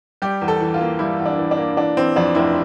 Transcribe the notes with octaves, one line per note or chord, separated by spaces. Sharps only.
G3 G4
E2
A4
E3
F4
A#3
G3 E4
E2
D4
E3
D4
A#3
E3 D4
E3 C4
F2 D4
F1 E4